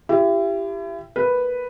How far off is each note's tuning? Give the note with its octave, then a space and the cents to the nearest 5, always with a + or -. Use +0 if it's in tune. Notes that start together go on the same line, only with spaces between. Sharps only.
E4 +35 G4 +0
A#3 +0 B4 +0